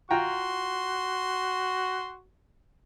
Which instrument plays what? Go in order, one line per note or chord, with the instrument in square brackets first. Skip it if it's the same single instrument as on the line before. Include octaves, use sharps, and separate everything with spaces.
[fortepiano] F4 G5 A#5 [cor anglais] F#4 [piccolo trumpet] C6